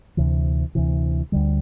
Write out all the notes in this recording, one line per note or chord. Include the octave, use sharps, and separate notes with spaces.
D2 C3 E3
D2 C3 E3
D2 D3 G3